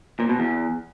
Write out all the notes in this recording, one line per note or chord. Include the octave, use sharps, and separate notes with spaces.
A#2
B2
E2